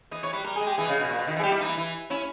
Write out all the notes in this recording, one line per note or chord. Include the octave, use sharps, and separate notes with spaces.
E3 D#5
E3 C#5
G3 B4
G3 A#4
G#3 G#4
G4
E3 G#4
B2
C#3
B2
A#2
B2
D#3
E3
G#4
G3 G4
E4
E3 D#4
E4
E3
C#4 E4